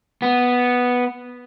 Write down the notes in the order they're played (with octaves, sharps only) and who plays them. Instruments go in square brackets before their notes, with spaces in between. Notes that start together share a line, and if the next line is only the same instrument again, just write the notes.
[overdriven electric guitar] B3